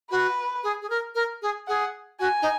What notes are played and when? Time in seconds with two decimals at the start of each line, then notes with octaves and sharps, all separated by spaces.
0.11 F#4 B4
0.64 G#4
0.82 G#4
0.90 A#4
1.15 A#4
1.42 G#4
1.68 G#4 F#5
2.20 F#4 G#5
2.42 D#4